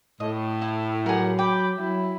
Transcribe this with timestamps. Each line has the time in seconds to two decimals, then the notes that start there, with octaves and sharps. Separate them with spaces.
0.20 A2 D#5
0.62 E4
1.06 F#3 G4 G#4 A#4 F#5
1.39 G5 B5 D6
1.79 F#3 E4